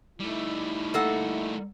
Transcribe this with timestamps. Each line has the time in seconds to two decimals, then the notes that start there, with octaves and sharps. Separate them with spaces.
0.20 G3 A3 D#4 E4
0.94 A#3 A4 F#5